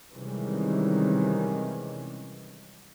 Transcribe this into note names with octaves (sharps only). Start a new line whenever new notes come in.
C3 D#3 E3 G3 G#3 C#4